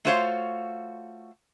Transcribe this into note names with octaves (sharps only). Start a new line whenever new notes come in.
A3 F4 F#4 C5 C#5 F5